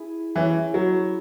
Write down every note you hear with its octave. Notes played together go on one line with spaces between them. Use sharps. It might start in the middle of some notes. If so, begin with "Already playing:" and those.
Already playing: E4 G#4 E5
E3 C#4 E4 G#4
F#3